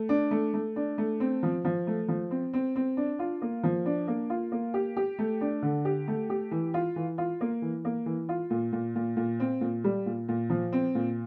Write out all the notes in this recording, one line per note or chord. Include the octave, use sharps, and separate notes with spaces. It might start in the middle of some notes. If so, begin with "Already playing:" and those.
Already playing: A3
D4
A3
A3
D4
A3
C4
F3
F3
A3
F3
C4
C4
C4
D4
F4
A#3
F3
D4
A#3
F4
A#3
G4
G4
A3
D4
D3
G4
A3
G4
E3
F4
E3
F4
A#3
E3
A#3
E3
F4
A#2
A#2
A#2
A#2
C4
A#2
G3
A#2
A#2
F3
C4
A#2